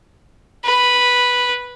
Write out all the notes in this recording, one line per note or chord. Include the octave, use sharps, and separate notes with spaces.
B4